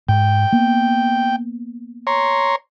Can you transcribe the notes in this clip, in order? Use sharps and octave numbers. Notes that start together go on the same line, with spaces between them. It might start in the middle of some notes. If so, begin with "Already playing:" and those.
G#2 G5
A#3 B3
C#5 A#5 C6